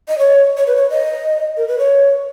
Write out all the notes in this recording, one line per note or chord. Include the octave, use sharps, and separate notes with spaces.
D#5
C#5
C#5
B4
C#5
D#5
A#4
B4
C#5